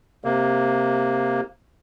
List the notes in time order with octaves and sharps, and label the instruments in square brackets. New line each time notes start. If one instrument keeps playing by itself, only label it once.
[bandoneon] C3 A#3